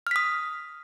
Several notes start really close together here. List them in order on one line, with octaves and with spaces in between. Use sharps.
F6 B6 D#6